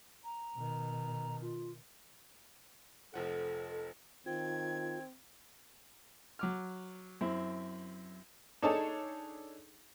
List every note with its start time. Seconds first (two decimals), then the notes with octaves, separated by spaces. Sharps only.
0.23 A#5
0.55 B2 D#3
1.41 F4
3.14 F1 F3 A4 F#5
4.26 D#3 C4 F4 G#6
6.39 F#3 D6 F6
7.21 F#2 C4 E4 E5
8.62 D4 D#4 G#4 A4 C#5 A5